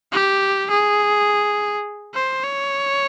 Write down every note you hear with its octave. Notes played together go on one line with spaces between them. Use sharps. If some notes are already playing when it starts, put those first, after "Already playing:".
G4
G#4
C5
C#5